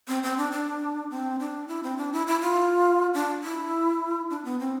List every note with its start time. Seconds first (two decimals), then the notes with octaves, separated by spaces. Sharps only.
0.08 C4
0.23 C4
0.38 D4
0.52 D4
1.10 C4
1.40 D4
1.68 E4
1.83 C4
1.97 D4
2.13 E4
2.27 E4
2.41 F4
3.14 D4
3.43 E4
4.30 D4
4.45 B3
4.60 C4